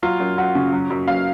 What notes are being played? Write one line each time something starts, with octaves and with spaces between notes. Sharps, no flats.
F#3 F4
F#2
F#2 F#4
C#3
F#3
F#2
F#2 F5